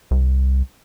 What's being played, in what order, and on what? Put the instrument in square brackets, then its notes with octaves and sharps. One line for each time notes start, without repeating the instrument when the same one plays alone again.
[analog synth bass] C2